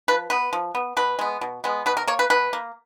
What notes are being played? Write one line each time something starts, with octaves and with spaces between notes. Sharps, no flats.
F3 B4
B3 B4
F3
B3
B2 B4
G#3 B3
B2
G#3 B3
B2 B4
A#4
A#3 C#5
B4
B2 B4
A#3